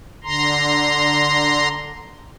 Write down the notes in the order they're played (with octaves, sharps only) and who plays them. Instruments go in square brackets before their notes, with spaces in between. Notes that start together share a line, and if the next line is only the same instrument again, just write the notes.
[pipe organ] D3 A#5 C6